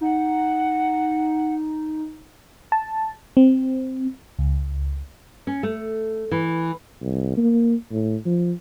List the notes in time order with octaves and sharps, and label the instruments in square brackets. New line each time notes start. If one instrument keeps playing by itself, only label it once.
[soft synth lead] D#4 [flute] F#5
[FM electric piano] A5
C4
C#2
[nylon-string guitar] C#4
A3
E3
[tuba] C2
A#3
A2
F3